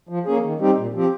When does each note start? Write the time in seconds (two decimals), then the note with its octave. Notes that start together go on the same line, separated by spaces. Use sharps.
0.09 F3
0.26 A#3 C#4 G#4
0.43 D#3
0.59 G3 C4 D#4 G4
0.77 A#2
0.94 F3 C4 G4